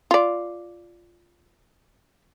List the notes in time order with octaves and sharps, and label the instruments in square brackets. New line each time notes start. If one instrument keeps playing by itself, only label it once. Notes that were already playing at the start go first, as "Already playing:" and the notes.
[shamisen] F4 D5